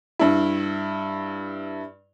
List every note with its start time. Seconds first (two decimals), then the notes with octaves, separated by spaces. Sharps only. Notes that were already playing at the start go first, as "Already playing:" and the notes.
0.19 G2 E4